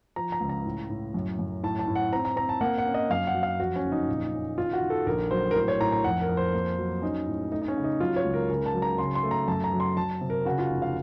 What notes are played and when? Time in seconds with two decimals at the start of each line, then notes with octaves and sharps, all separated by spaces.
0.16 F3 A#5
0.32 A#5
0.40 C#2
0.49 A#5
0.65 A2
0.89 A2
1.14 F#2
1.39 F#2
1.63 A2 A5
1.79 A5
1.87 A2
1.95 F#5
2.12 C4 A#5
2.25 A#5
2.36 C4 A#5
2.49 A5
2.61 A#3 F#5
2.78 F#5
2.86 C#4
2.94 D#5
3.10 F#2 F5
3.27 F#5
3.35 F#3
3.43 F5
3.59 F2 F#4
3.76 C#4
3.84 F#1
3.92 D#4
4.09 A#2
4.33 C#4
4.57 D#3 F4
4.73 F#4
4.82 D#3
4.90 A4
5.06 A#1 A#4
5.31 F#3 C5
5.51 A#4
5.55 A2 C5
5.68 C#5
5.80 A2 A#5
5.92 A#5
6.04 F2 F#5
6.21 A#4
6.29 F2
6.37 C5
6.54 A#3
6.78 F#3
7.02 C#4 D#4
7.27 A2
7.52 A3 D#4
7.62 D#4
7.68 C#4
7.77 C#3
7.84 D#4
8.00 F#3 F4
8.16 C#5
8.25 C#2
8.34 A#4
8.49 C#3 A#4
8.66 A5
8.74 F#3
8.82 A#5
8.98 C#3 C6
9.15 C6
9.24 A3
9.31 A#5
9.48 F#2 A5
9.64 A#5
9.73 F#3
9.80 C6
9.97 F#3 A5
10.21 C3
10.30 A#4
10.45 C#3 F#4
10.59 F4
10.70 F1
10.82 F5